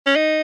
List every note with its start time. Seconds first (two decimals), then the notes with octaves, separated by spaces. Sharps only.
0.06 C#4
0.16 D#4